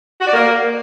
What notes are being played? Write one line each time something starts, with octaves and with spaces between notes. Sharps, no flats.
F#4
D5
A#3